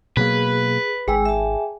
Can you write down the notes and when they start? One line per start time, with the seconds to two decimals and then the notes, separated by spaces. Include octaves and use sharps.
0.17 B2 F#3 A#3 G#4 B4
1.08 G#1 G#3 G#4 G5 G#5 E6
1.25 E5 A5